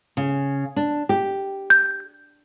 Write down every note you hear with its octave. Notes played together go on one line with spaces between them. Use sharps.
C#3
D4
G4
G6